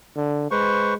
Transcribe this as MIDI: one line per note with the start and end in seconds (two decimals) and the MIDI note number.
0.16 0.48 50
0.51 0.96 56
0.51 0.94 71
0.51 0.94 72
0.51 0.94 85